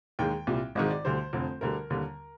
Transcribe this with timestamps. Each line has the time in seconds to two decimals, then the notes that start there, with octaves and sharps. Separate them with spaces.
0.19 D#2 D#3 G#3 G5
0.47 C2 A#2 G3
0.75 G#1 G#2 D#3 G#3 D#5
0.90 D5
1.05 D2 D3 G3 C5
1.33 F1 F2 D3
1.61 D2 D3 G3 A#4
1.90 D#2 D3 G3